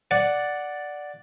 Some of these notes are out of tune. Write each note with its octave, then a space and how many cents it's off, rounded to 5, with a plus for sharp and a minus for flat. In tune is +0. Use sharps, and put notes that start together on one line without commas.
D5 +0 F#5 +0